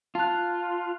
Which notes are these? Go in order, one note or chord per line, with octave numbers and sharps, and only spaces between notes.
F4 A5 F#6